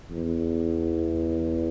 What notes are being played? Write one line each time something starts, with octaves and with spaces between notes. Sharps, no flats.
E2